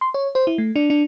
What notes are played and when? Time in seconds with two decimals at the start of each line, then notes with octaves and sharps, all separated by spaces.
0.01 C6
0.14 C#5
0.35 C5
0.47 E4
0.58 A3
0.76 D4
0.90 D4